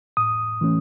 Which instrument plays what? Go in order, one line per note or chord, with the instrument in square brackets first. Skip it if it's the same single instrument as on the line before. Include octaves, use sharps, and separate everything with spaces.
[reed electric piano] A2 D#6
E3 A3 C#4